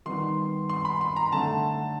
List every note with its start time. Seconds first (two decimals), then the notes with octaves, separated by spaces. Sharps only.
0.06 D#3 G3 B3 C6
0.69 C6
0.85 B5
1.01 C6
1.16 A#5
1.32 D3 F#3 A3 D4 A5